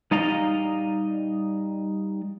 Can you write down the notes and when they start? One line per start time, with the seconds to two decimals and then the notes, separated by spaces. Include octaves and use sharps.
0.11 G3 D#4 D5 D#5 F5 A#5